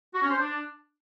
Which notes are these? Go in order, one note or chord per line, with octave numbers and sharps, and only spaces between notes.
F#4
C#4
C5
D4